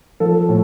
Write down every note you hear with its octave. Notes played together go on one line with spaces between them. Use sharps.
F3 A4
A2